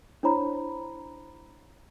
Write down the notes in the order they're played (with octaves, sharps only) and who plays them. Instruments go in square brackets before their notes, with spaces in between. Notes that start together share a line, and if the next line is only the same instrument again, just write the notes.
[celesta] D4 E4 C5 C#5 A#5 B5